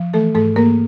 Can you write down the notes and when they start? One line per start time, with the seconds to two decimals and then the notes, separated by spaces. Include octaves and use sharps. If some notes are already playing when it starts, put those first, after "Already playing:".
Already playing: F3
0.14 E3 A3 A4
0.35 G#2 A3 A4
0.56 G#2 A#3 A#4